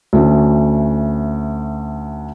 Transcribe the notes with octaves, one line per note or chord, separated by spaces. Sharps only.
D2 A3 C#4